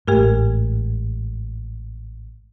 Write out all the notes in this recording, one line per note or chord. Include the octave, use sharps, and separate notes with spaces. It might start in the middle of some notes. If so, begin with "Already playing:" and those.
A1 G#2 A3 G4 A#4